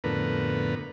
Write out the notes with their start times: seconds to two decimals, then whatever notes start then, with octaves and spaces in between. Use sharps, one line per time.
0.04 F2 A2 D3 B3 A#4 B4